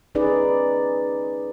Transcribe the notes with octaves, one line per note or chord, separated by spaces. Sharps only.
C#4 D#4 G#4 B4 D5